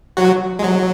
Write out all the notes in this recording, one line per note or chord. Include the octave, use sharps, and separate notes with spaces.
F#3 F#4
G#3
F#3